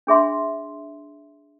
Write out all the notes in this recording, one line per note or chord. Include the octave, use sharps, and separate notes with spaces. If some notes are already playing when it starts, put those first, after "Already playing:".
D4 G#4 E5 C6